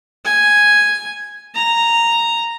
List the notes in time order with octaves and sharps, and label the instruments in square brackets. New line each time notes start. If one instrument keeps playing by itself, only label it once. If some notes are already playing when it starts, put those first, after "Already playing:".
[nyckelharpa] G#5
A#5